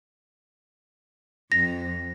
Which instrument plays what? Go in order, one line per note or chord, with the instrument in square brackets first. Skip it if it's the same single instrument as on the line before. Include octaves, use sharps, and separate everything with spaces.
[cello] F2 [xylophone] A#6